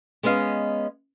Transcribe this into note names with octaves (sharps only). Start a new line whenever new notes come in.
G#3 B3 C#4 D#5 F5